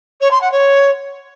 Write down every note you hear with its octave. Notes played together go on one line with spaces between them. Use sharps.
C#5
C6
F#5
C#5